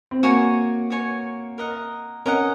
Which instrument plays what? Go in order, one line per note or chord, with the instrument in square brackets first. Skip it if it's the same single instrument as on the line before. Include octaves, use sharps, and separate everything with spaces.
[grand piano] C4
[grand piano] A#3 [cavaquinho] F#4 C#5 G#5 C#6
[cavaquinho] F#4 C#5 G#5 C#6
A#4 D#5 F#5
[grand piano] C#4 [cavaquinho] A#4 D#5 F#5